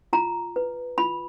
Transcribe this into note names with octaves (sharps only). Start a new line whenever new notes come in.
F4 A#5
B4
F4 B5